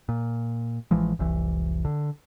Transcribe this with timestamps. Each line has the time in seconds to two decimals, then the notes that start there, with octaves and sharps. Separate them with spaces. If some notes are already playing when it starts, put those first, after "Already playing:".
0.09 A#2
0.91 A1 E3 F3 G#3
1.19 F1 C2 E3
1.85 D3